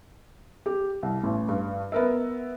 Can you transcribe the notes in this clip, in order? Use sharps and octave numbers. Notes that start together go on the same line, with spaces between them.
G4
C2
A1
G2
B3 A#4 E5